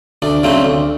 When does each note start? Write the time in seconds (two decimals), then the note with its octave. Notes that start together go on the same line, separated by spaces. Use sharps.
0.22 D2 D4
0.43 C#3 F#3 A3 C4
0.65 D2